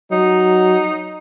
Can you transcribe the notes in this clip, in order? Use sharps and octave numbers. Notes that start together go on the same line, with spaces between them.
F#3 D#4